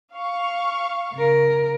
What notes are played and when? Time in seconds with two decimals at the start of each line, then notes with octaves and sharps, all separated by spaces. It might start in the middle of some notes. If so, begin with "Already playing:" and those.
0.15 F5 C#6
1.14 C#3 A#4